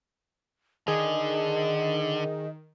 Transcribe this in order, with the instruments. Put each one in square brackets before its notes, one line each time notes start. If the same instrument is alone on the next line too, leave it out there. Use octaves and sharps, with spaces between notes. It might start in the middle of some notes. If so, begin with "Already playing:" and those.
[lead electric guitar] D3 [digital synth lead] D#3 [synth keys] G#4 [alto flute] D#5